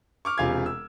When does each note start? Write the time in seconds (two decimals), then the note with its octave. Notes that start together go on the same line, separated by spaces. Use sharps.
0.25 C#6 D6 F6
0.38 E1 C3 F4 F5 G#5 G#6
0.66 E6